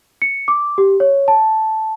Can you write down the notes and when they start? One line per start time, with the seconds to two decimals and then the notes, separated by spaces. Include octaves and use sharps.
0.22 C#7
0.48 D6
0.78 G4
1.00 C#5
1.28 A5